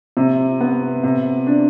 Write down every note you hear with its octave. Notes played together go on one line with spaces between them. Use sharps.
C3
B3
C3
D4